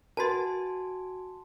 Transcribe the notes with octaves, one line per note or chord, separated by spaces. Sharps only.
F#4 A#4 B4 G#5 A5 C6 A6